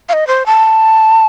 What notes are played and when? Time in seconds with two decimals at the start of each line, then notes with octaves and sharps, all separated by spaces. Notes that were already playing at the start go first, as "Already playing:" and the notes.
0.09 F5
0.13 D#5
0.27 C5
0.46 A5